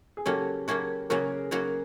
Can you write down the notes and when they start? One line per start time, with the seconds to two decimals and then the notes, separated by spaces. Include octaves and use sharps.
0.17 G#4
0.26 C#3 F#3 A#3 C#4 F#4 G4 A4
0.68 C#3 F#3 A#3 C#4 F#4
1.10 C#3 F#3 A#3 C#4 F#4 G#4 A#4
1.51 C#3 F#3 A#3 C#4 F#4